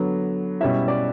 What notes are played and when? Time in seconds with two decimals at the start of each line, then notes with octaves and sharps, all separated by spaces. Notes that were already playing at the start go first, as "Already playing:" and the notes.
Already playing: D3 F#3 B3
0.60 B2 G3 C#4 E4 E5
0.88 D5